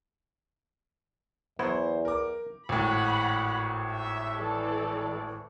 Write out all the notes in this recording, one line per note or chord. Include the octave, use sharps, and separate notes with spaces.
E2 F#3 B3 E4 C5
A#4 D6
G#1 A2 F#5 B5
E5
E3 A4 D5